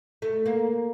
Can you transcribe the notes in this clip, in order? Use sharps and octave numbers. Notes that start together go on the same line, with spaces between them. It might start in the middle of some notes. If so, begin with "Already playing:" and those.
A3
A#3